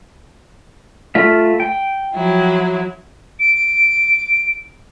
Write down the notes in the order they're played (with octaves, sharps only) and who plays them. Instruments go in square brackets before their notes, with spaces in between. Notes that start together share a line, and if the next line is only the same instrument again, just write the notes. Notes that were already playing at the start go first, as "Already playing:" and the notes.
[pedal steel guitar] A3 F4 E5
G5
[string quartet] F3 F#3 E4
[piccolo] D7